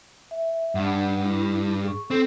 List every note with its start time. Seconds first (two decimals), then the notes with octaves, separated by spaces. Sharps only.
0.31 E5
0.75 G2 D4 F#5
1.25 E4
1.84 G#4 C#6
2.11 C4 A4